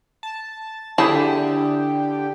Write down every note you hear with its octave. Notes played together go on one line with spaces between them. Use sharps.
A5
D3 E4 G4 G#4 A5